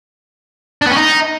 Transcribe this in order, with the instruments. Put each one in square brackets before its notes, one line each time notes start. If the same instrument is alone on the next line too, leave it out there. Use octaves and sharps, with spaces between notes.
[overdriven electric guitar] D4
B3
C#4
D#4